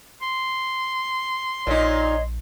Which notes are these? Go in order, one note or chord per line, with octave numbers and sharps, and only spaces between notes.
C6
A#1 A#2 D#4 C#5 D#5